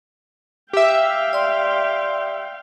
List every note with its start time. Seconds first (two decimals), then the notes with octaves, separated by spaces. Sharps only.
0.73 G4 E5 F5 G5
1.33 D5 C6